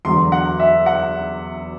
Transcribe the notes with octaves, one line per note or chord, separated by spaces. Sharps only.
E2 D3 F#3 C6
F#5
E5
F#5